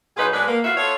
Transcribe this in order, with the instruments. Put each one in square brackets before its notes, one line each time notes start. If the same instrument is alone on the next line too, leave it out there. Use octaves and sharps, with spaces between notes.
[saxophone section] B2 F#3 D#4 F4 G#4 B4
B2 G#3 D4 G#4 B4
A#3
F2 B3 E4 F#4 E5 F5
B3 F4 A4 C#5